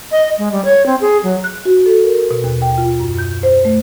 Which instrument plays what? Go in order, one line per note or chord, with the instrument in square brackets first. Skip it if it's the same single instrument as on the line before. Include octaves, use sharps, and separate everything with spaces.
[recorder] D#5
G#3
G3
C#5
C4
G#4
F#3
[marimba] F#6
F#4
A4
A#4
B2
D#2
G5
F4
F#2
G6
C5
A3